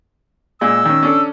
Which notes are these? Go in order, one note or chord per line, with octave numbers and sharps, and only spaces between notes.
A#2 G#3 E6
D#3 C#4
C#4 D4 A4